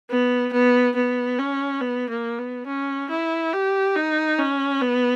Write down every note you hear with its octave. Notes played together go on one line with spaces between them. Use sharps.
B3
B3
B3
C#4
B3
A#3
B3
C#4
E4
G4
D#4
C#4
B3